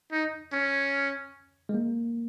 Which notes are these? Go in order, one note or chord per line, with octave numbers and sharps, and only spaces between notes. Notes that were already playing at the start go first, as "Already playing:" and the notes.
D#4
C#4
G#3
A#3